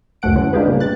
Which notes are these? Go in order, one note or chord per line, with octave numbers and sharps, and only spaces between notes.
C#2 F#2 C3 A3 F#5 D7
D3 E3 G#3 C#4
D4 D#4 F4 G4 G#4 B4
G2 A#2 C#3
F#6 A6